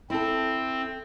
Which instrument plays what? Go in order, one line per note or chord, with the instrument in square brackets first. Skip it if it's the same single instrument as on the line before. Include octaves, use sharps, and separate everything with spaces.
[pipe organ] C4 [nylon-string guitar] E4 A4